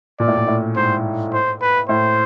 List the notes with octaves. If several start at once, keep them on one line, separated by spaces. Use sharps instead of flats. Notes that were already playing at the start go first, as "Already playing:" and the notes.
A#2 D5
A2
A#2
A2
G#2 C5
C5
B4
A2 C5